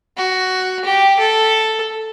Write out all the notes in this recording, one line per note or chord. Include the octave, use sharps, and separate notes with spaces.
F#4
G4
A4